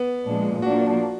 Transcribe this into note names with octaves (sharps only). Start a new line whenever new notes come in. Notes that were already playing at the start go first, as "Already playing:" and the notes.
Already playing: B3
A#2 F3 G#3 D4
F3 A#3 D4 F#4